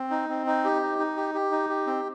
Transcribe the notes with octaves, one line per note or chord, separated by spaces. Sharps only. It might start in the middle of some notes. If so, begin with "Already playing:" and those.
Already playing: C4
D#4
C4
D#4
G4
D#4
D#4
G4
G4
D#4
G4
C4